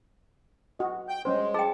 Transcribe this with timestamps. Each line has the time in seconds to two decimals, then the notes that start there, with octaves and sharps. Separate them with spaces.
0.79 F#4 D#5
1.09 G5 G6
1.25 G3 G#3 C#4 C5
1.54 G#4 G5 A5